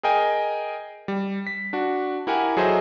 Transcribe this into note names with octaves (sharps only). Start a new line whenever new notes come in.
G#4 A#4 D#5 G5 G#5
G3
B6
D4 F#4
E4 G4 A#4 F#5 G#5 A#5
F#3 G#4 A4 C5 D#5 E5